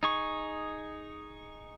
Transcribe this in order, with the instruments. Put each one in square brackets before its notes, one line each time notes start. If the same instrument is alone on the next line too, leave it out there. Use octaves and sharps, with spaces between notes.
[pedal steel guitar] D#4 G#4 C#6